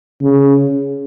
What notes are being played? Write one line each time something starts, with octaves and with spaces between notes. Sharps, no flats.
C#3